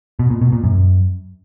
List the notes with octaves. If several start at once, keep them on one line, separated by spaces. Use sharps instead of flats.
B2
A#2
B2
A#2
F#2